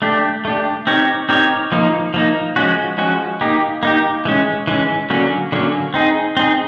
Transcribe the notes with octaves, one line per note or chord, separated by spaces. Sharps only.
A3 D4 G4
A3 D4 G4
C4 D#4 G4 A#4 C#5
C4 D#4 G4 A#4 C#5
F3 A#3 D#4
F3 A#3 D#4
F3 G#3 C#4 F#4
F3 G#3 C#4 F#4
A#3 D#4 G4
A#3 D#4 G4
E3 G#3 C#4
E3 G#3 C#4
D3 F#3 A#3 C#4
D3 F#3 A#3 C#4
C4 D#4 G#4
C4 D#4 G#4